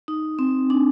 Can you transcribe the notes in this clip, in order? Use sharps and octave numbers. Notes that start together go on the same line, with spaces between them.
D#4
C4
D4